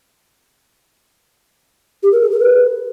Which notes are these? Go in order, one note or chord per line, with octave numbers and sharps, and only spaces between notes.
G4
A#4
G#4
A#4
B4